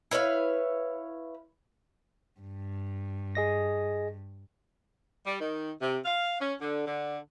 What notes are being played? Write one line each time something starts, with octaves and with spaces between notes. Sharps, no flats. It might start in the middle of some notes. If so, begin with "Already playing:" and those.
E4 B4 C#5 F5
G2
G#4 D#5 A#6
G3
D#3
C3
F5
C#4
D3
D3